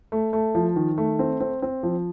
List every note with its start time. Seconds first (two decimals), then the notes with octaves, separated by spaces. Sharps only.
0.12 A3
0.33 A3
0.55 F3
0.76 D#3
0.98 A3
1.19 C4
1.40 C4
1.62 C4
1.83 F3